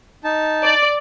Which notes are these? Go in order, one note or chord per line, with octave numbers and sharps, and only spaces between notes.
D#4 A5
D5